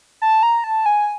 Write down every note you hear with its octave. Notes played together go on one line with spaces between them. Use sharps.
A5
A#5
A5
G#5